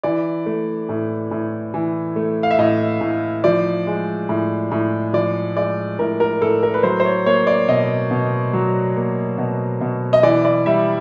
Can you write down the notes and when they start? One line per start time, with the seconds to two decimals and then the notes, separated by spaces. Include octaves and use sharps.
0.03 E3 D5
0.46 A3
0.89 A2
1.31 A2
1.74 E3
2.16 A3
2.43 F5
2.51 E5
2.59 A2 D#5
3.01 A2
3.44 F3 D5
3.87 G#3
4.29 A2
4.71 A2
5.13 F3 D5
5.56 G#3 D5
5.99 A2 A#4
6.20 A#4
6.41 A2 A4
6.63 A#4
6.74 B4
6.83 F#3 C5
7.00 C5
7.05 C#5
7.26 A#3 C#5
7.47 D5
7.68 B2 D#5
8.11 B2
8.53 F#3
8.96 A#3
9.38 B2
9.81 B2
10.13 D#5
10.23 E3 D5
10.45 D5
10.66 G3 E5